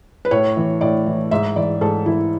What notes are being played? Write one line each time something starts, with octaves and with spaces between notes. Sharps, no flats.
B4
A2 C#5
E3
A2 D5
E3
G#2 E5
E3 D5
G#2 A4
E3 E4